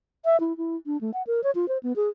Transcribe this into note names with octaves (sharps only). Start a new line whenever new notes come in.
E5
E4
E4
D4
A3
F#5
A#4
C#5
F4
C5
B3
G#4